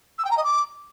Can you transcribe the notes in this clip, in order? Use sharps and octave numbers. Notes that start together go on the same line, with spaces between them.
E6
G5
A#5
D#5
D6